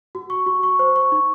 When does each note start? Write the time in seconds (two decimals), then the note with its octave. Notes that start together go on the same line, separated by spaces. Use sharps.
0.15 F#4
0.30 C#6
0.46 F#4
0.63 C#6
0.79 C5
0.96 C#6
1.12 D#4